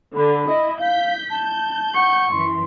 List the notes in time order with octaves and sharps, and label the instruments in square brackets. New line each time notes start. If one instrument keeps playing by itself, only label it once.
[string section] D3 [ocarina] B5
[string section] E4 D#5
[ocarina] F5 [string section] G6 B6
[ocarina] A5 [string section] G6
[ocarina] F#5 [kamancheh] C#6
[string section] F#2 E3 [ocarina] C6